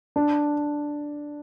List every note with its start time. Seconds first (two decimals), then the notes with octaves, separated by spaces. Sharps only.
0.16 D4